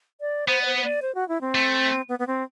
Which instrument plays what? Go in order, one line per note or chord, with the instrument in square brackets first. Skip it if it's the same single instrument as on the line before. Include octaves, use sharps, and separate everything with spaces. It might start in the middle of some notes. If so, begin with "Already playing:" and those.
[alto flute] D5
[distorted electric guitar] B3 [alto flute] C5
[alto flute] D5
C5
C5
D5
C5
F#4
E4
C4
[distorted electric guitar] A3
[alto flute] B3
B3
C4